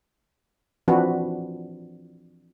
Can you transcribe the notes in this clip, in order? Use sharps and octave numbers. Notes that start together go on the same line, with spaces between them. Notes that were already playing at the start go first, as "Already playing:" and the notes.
E3 F3 C4 D4 F#4 B4